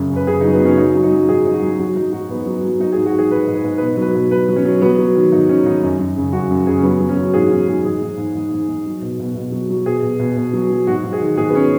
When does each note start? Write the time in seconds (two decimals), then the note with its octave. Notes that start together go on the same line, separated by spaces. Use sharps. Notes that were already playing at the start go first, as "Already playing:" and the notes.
Already playing: F#2 C#3
0.11 F#2
0.16 B4
0.27 C#3 G#4
0.41 D#4
0.44 F#3
0.53 B3
0.62 C#3 C#4
0.78 F#3 D#4
0.95 F#3
1.03 D#4
1.13 F#3
1.29 G#2 G#4
1.46 F#3 D#4
1.54 F#4
1.63 F#3
1.79 F#3 F#4
1.95 F#3 D#4
2.12 G#2 F#4
2.29 G#2 B3
2.46 F#3
2.64 F#3
2.80 F#3 D#4
2.92 G#4
2.97 G#2
3.06 F#4
3.13 G#2
3.19 G#4
3.30 G#2 B4
3.47 G#2
3.55 B4
3.64 G#2
3.77 B2 B4
3.97 F#3 B4
4.15 B2
4.31 F#3 B4
4.49 F#3
4.56 C#4
4.65 F#3
4.81 F#3 B3
4.99 F#3
5.15 D#3
5.32 G#2 D#4
5.49 D#3 C#4
5.66 G#2 D#4
5.82 F#2
5.99 F#2
6.16 C#3
6.33 F#2 F#4
6.51 F#2
6.67 C#3 G#4
6.77 C#4
6.83 F#3 B3
7.01 F#3
7.09 C#4
7.17 F#3
7.34 G#2 G#4
7.51 G#2 C#4
7.67 G#2 G#4
7.85 G#2 G#4
8.01 G#2
8.18 G#2
8.35 G#2
8.52 G#2
8.68 G#2
8.86 F#3
9.02 B2
9.20 B2
9.36 B2
9.52 F#3
9.70 F#3
9.86 B2 G#4
10.03 B2
10.19 B2
10.37 B2
10.53 F#3
10.70 F#3
10.87 G#2 F#4
11.03 G#2
11.13 G#4
11.21 D#3
11.38 G#2 G#4
11.49 B3
11.55 C#4